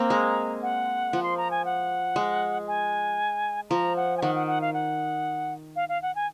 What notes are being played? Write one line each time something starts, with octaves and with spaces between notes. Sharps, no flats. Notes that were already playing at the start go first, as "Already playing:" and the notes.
Already playing: A#3 C4 A#5
G#3
F#5
F3
C6
A#5
G#5
F#5
G#3
G#5
F3 A#5
F#5
G#5
D#3 F#5
F#5
F#5
F5
F#5
F5
F5
F#5
G#5